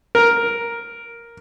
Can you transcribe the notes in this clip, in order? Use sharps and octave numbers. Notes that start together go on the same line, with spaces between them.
A#4